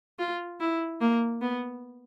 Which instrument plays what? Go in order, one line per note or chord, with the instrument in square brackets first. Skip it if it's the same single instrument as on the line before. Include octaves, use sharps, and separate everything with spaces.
[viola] F4
E4
A#3
B3